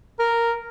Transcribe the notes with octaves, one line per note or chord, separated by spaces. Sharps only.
A#4